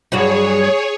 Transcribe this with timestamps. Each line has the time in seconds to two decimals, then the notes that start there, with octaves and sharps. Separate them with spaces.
0.12 G2 F#3 F#4 G#4 C#5